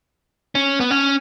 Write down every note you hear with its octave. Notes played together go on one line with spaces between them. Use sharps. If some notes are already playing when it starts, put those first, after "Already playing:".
C#4
B3
C#4